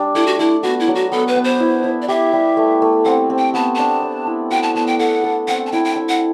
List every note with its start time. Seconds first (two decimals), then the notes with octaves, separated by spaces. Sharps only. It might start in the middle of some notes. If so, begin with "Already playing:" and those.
Already playing: G3 D4
0.15 A3 E4
0.27 F#4
0.39 A3 E4
0.63 B3 F#4
0.80 E4
0.88 F#3
0.95 F#4
1.12 B3 A4
1.28 B4
1.36 B3
1.44 C5
1.60 E4
1.84 E4
2.02 D5
2.08 G4 E5
2.33 G3
2.57 A3
2.82 A3
3.05 C4 F#5
3.30 C4
3.38 G5
3.54 B3 A5
3.76 D4 A5
4.02 D5
4.27 E4
4.51 F#4 G5
4.63 A5
4.75 B3 A5
4.87 G5
4.99 A4 F#5
5.24 A4
5.48 C4 F#5
5.67 A5
5.72 E4 G5
5.85 G5
5.96 E5
6.09 F#5